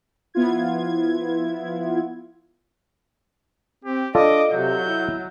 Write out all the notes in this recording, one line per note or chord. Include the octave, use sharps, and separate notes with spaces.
F3 B3 E4 F4 G#6
C4 G4
D4 F4 A4 D5 D#5 D6
C3 F#3 G6
E4